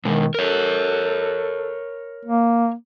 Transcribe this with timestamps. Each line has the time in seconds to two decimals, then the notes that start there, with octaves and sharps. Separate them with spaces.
0.05 B2 D#3 G#3
0.34 A4 A#4 C#5
2.25 A#3